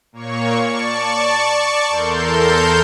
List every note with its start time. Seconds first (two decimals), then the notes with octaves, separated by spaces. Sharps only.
0.12 A#2 A#3 C#5 C#6
0.62 D5 A5 C#6
1.89 E2 A4 A#4 C6 G6